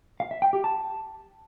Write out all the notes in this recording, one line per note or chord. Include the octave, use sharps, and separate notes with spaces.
F5
E5
G5
G4
A5